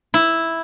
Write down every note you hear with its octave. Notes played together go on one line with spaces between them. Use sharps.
E4